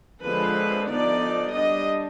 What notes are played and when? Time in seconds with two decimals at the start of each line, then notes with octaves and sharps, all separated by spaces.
0.24 D3 F3 G#3 C4 B4
0.90 D3 F3 B3 D#4 D5
1.54 G3 D4 D#5